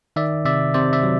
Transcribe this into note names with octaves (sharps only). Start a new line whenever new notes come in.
D#3 D5 E5
C3 D5 E5
C3 C5 D5
D5 E5
F#3